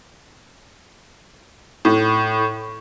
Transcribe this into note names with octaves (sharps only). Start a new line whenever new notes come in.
A2